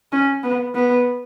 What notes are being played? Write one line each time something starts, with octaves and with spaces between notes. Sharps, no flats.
C#4
B3
B3